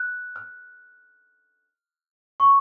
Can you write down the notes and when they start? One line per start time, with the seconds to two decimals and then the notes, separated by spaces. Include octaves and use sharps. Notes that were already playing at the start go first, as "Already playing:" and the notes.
Already playing: F#6
0.36 F6
2.40 C#6